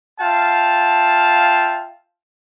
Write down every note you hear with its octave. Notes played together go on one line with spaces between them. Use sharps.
F4 E5 F5 G5 A5